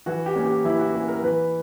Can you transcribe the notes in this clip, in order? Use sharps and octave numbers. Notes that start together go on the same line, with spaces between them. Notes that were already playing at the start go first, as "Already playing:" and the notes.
E3 F#4
G4
A#3 C#4
G4
E3 E4
F#4
A#3 C#4 G4
A#4
E3 B4